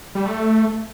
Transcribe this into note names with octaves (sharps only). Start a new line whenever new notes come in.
G3
A3